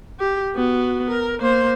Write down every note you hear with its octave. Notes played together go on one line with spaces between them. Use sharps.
G4
B3 F#4
A#4
A#3 C5